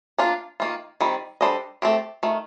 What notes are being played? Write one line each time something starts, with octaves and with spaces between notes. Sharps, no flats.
A#3 D4 F4
D#3 A#3 F4
D#3 G3 C4
G3 D4 A4 C5 D#5
A3 C4 G4
D#3 A3